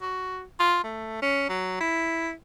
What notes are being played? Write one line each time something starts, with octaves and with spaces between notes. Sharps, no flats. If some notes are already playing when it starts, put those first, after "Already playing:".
F#4
F4
A3
C#4
F#3
E4